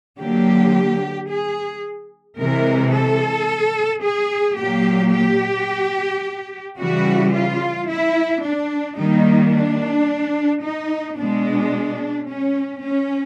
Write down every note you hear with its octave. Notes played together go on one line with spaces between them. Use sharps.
D3 F#3 A#3 G4
G#4
C3 E3 G#3 A#4
A4
G#4
A#2 F#3 A#3 G4
G4
C#3 E3 G3 F#4
F4
E4
D4
D#3 G3 A#3 D#4
D4
D#4
B2 G#3 D4
C#4
C#4